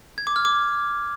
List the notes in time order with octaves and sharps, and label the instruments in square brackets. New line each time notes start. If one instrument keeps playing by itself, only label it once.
[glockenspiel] G#6
D6
F6
D6